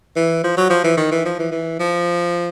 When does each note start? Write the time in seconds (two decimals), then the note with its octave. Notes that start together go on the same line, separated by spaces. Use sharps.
0.16 E3
0.44 F3
0.57 F#3
0.70 F3
0.84 E3
0.97 D#3
1.11 E3
1.25 F3
1.39 E3
1.52 E3
1.79 F3